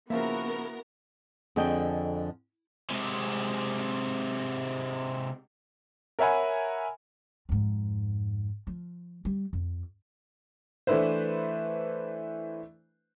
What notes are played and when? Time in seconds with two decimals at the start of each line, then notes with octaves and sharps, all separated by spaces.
0.10 C#3 F3 A#3 B3 E4 F#4 A#4 E5
1.56 F2 D3 G#4 D#5 G5
2.90 C3 G#3
6.19 A#4 C#5 E5 F#5 G#5 B5
7.49 F2 G#2
8.67 F3
9.25 G3
9.53 F2
10.87 E3 A3 D4 E4 B4 C5